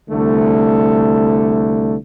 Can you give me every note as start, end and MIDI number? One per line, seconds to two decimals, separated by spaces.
0.10 1.97 36
0.10 1.97 50
0.10 1.97 57